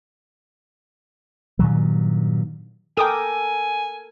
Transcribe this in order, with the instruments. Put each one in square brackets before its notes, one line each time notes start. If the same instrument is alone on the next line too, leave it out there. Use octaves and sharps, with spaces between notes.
[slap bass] G2 A#2 D#3 F#3
[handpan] A4 A#4 [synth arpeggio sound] G5 D6 D#6 [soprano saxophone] G#5